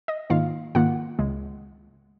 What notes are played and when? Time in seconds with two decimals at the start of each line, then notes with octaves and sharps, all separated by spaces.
0.08 D#5
0.30 G#2 D#3 A#3 F4 F5
0.75 G#2 D#3 A#3 F4 F#5
1.19 C#2 C#3 G#3